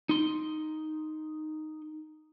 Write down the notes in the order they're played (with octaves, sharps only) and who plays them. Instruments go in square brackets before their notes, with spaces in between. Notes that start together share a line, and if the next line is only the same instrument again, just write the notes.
[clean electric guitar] D#4 C6